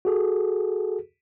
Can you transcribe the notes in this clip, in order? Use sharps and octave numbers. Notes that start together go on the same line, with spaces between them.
F#4 G#4 A4